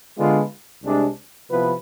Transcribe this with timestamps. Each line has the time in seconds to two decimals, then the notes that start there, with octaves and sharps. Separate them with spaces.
0.18 D3 G#3 B3 D4 F4
0.83 C2 C3 G#3 D4
1.49 C3 F3 B3 E4 B4